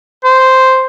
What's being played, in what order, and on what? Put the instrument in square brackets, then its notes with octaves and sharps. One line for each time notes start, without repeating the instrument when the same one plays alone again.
[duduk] C5